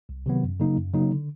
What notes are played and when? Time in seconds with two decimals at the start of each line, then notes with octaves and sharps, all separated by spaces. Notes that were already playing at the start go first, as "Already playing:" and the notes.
0.09 C2
0.26 C3 D#3 F#3 B3
0.43 F#2
0.60 C#3 F#3 A#3 D#4
0.77 F#2
0.93 C#3 F#3 A#3 D#4
1.11 D3